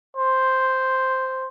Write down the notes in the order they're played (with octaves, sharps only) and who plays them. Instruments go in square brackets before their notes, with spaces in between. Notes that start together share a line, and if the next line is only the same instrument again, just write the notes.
[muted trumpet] C5